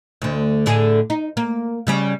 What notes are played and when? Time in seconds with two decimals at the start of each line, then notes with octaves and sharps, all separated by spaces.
0.22 D2 D3
0.66 A2 D3 G#4
1.10 D#4
1.37 A#3
1.87 C#3 G3 C#4